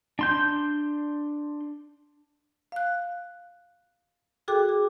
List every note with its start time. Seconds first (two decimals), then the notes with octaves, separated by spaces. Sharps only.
0.19 D4 C6 G6
2.72 F5 F#6
4.48 F#4 G#4 A4 G5 D6 F#6
4.69 G#4